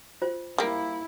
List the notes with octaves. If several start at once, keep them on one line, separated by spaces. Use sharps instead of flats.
F4 C5
G3 A#3 E4